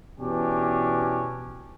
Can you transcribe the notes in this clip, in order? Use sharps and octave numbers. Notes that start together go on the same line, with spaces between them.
B2 E3 C#4 D4 G4